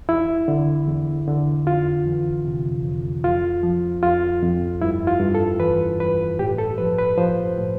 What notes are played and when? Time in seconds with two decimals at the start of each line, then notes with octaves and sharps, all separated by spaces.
0.09 E2 E4
0.48 D3
0.88 E2
1.28 D3
1.67 F2 F4
2.07 E3
2.45 C3
2.84 F2
3.23 F2 F4
3.63 F3
4.03 F2 F4
4.42 F2
4.82 G2 E4
5.07 F4
5.20 G2
5.35 A4
5.60 E3 B4
5.99 G2 B4
6.39 A2 G4
6.58 A4
6.78 F3 B4
6.98 B4
7.18 F3 C5
7.58 A2